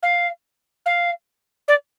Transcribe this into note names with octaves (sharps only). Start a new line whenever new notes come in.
F5
F5
D5